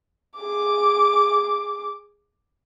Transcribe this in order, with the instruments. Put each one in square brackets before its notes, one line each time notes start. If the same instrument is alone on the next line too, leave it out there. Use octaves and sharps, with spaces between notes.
[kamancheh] G#4 D6